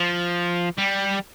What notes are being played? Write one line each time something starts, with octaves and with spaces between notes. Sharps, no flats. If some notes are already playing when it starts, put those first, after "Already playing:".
Already playing: F3
G3